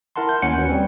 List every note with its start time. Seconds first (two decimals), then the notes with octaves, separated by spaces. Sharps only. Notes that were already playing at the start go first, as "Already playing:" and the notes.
0.16 E4 A#4 F#5 A5 C6
0.29 G6
0.42 D#2 C#4 C#5 F#5 G#5 C#7
0.58 C#4 F#4 B4
0.69 G3 C4